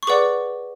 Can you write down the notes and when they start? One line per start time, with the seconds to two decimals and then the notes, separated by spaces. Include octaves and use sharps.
0.03 C#6
0.07 G#4 B4 D5 F#5 D6